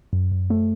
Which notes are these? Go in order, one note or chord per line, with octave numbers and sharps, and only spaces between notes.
F#2
F#2
A3